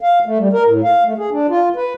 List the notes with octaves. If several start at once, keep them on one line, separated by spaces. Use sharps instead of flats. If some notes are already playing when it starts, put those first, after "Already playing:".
F5
A3
G3
A#4
A2
F5
A3
G#4
D4
F4
B4